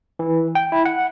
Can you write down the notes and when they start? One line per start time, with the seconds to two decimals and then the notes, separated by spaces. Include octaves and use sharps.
0.19 E3
0.55 G5
0.72 E4
0.85 F#5